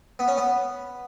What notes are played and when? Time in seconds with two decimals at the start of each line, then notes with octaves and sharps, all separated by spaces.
0.19 B3
0.28 C#4
0.38 B3